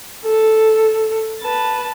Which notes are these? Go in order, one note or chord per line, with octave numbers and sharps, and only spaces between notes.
A4
B4 A5